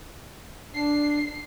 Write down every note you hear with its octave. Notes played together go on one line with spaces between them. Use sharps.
D4 C7